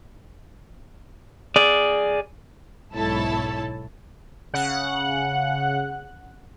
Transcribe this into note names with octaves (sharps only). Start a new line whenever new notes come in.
G#4 D5
B1 G#2 E4 A4 C#5 A5
C#3 F#5 F#6